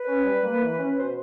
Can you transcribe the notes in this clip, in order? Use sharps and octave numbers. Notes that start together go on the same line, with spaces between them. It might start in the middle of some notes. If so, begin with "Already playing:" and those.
Already playing: B4
C#4
G3
A#3
E3
C#4
B2 C5